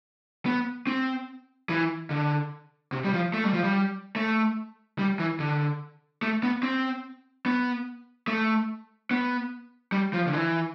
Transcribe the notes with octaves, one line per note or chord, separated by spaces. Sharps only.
B3
C4
E3
D3
C3
G3
F3
A3
G3
F3
G3
A3
G3
E3
D3
A3
B3
C4
B3
A3
B3
G3
F3
D3
E3